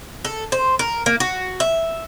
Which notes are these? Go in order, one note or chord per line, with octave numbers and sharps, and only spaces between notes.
A4
C5
A#4
A#3
F#4
E5